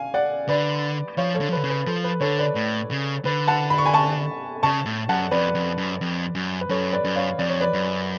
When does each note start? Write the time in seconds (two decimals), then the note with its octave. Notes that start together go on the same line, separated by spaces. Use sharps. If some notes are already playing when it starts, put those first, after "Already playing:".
Already playing: F5 G#5
0.14 D5 F#5
0.48 D3 B4 D5
1.17 F3 C#5 F5
1.35 A4 C#5
1.41 D3
1.49 F3
1.52 D3 B4
1.64 C#3
1.69 B4
1.87 F3 A4
2.04 B4
2.21 D3 A4 C#5
2.38 B4 D5
2.55 A2
2.91 C#3
3.25 D3 B4
3.47 F#5 A5
3.70 B5
3.78 C#6
3.86 G#5 B5
3.94 A5 C#6
4.63 C#3 A5 C#6
4.86 A2
5.09 F#2 F#5 A5
5.31 F2 B4 D5
5.55 F2
5.78 F#2
6.01 F2
6.35 F#2
6.61 B4
6.69 F#2 A4 C#5
6.93 B4 D5
7.04 F#2
7.16 C#5 F5
7.39 F2 D5
7.49 C#5
7.61 B4 D5
7.73 F#2